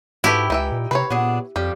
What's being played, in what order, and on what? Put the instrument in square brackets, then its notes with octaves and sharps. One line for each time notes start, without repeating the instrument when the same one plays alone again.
[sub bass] G#2 [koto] E4 G4 [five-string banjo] F#4 A4 B4
[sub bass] C#2 [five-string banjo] E3 B4 E5 [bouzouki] D#4 G5
[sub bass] A#2
[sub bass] C3 [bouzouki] C4 G#5 A#5 [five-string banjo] B4 C#5
[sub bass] A#2 [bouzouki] B3 D4 G#4
[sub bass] F2 [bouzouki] F3 G3 D4 [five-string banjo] G4